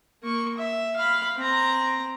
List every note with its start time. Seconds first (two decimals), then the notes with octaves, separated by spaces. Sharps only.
0.23 A#3 C#6
0.57 E5
0.96 F5 B5
1.37 C4 A#5